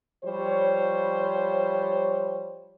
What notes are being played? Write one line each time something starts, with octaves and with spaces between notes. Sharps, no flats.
F3 G3 C5 C#5